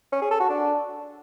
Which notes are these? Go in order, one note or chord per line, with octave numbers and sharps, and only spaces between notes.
C#4
G#4
A4
F#4
D4